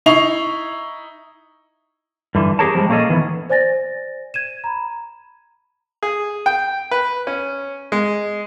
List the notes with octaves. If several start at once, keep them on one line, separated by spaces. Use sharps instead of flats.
D#4 E4 C#6 C7 F7
G2 D3 E3
C4 G4 G#4 A#4 C#5 A5
F3 G3 G#3
A#2 A#3 C#4 G#4 A4 D#5
D#3 E3 B3
C5 D5 G#5 A6 A#6
G#6 D#7 E7
A#5 B5
G#4
G5
B4
C#4
G#3